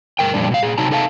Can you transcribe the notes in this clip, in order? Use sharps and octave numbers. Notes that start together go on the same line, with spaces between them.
G2 A#4 G5
F2 A#2 G3 D4
B2 F5
A#2 G#4
C3 F#3 D#4 A5 A#5
D#4 A4 E5 F5 A5